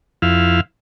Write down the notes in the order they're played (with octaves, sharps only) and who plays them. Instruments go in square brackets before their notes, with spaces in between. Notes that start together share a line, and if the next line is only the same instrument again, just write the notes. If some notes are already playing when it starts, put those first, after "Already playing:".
[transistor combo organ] F2 E4 F5